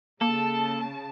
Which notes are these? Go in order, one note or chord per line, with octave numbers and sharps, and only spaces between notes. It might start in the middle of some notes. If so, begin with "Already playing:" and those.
C#3 A#3 A4 A5